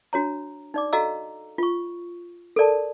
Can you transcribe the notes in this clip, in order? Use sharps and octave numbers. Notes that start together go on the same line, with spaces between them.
D4 F#4 C#5 A#5
D#4 D5 D6
F#4 A4 D#5 F5 A#5 E6
F4 C#6
A4 A#4 D5 A5